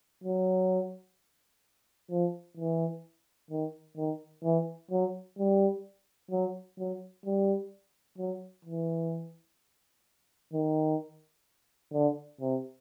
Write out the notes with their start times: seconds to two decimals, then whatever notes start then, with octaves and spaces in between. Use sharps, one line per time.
0.24 F#3
2.11 F3
2.57 E3
3.50 D#3
3.97 D#3
4.44 E3
4.91 F#3
5.39 G3
6.31 F#3
6.78 F#3
7.25 G3
8.18 F#3
8.65 E3
10.53 D#3
11.93 D3
12.40 C3